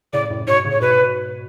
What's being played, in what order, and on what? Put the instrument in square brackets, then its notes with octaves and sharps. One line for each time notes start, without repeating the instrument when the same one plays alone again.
[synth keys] A2 C#3 [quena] D5
[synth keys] F#2 A2
[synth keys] G#2 B2 [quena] C#5
[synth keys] A2 C#3
[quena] C#5
[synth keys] G#2 B2 [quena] B4